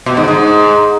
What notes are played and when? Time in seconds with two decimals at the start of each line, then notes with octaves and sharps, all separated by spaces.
0.06 B2
0.17 G#2
0.28 G#2